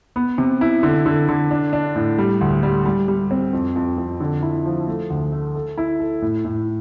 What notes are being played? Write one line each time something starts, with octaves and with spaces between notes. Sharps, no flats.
B3
C3
E4
D3
D3
D3
D4
D4
A2
G3
D2
G3
G3
G3
C4
F2
F2
F2
D3
E4
F3
A3
D2
A3
A4
E4
A4
A2
A2